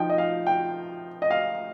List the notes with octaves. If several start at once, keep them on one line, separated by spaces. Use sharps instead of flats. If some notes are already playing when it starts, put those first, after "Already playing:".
Already playing: F3 D#4 G5
D#5
F5
G5
D#5
F5